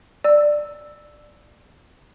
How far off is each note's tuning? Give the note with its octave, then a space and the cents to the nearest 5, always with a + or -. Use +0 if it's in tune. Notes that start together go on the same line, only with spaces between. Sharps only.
D5 +10 E6 +0